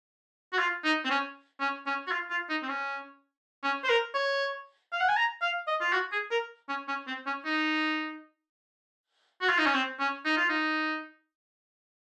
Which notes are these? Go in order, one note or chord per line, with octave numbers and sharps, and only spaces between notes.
F#4
F4
D#4
C4
C#4
C#4
C#4
F#4
F4
F4
D#4
C4
C#4
C#4
C5
A#4
C#5
F5
F#5
G#5
A#5
F5
D#5
F4
F#4
G#4
A#4
C#4
C#4
C4
C#4
D#4
F#4
F4
D#4
C#4
C4
C#4
D#4
F4
D#4